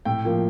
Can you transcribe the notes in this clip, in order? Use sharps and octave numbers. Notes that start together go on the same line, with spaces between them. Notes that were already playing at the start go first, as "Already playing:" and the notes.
A2 G5
F3 A#3